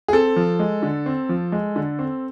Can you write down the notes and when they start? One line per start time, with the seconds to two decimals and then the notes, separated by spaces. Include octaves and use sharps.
0.08 G#4
0.13 C4 A4
0.36 F3
0.59 G#3
0.82 D3
1.06 C4
1.29 F3
1.52 G#3
1.76 D3
1.99 C4